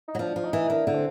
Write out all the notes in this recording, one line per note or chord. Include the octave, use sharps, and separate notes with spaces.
D#4
F#3
F3 D4
F3
D#4
E3
D#3 D4
D3
C4